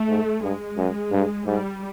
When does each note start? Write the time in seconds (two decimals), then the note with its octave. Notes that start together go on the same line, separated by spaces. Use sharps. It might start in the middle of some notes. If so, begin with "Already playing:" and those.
Already playing: A3
0.08 G#2
0.42 G2 G#3
0.78 F#2
1.12 G2
1.46 G#2 G3